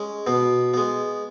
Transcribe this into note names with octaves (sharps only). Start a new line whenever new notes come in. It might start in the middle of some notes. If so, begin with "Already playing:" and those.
Already playing: G#3 C#4
B2 B3
G#3 B3